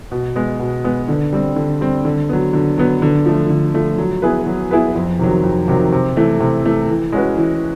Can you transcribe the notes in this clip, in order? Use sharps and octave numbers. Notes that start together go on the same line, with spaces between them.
B2
G#3 B3
B2
G#3 B3
D3
G3 C4
D3
G3 C4
D3
F#3 B3
D3
F#3 B3
D3
F3 A3
D3
F3 A3
F#3
B3 E4 G#4 B4
F#3
B3 E4 G#4 B4
F2
C3 D#3 F#3
F2
C3 D#3 F#3
C3
E3 A3
C3
E3 A3
E3
G#3 C#4 F#4 B4
E3